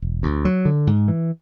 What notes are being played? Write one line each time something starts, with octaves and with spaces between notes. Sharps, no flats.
E1
D2
F#3
D3
G#2
E3